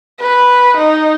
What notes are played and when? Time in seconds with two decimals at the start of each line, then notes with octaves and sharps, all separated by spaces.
0.20 B4
0.78 D#4